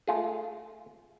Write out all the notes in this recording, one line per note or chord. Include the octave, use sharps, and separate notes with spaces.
A3 F4 G#4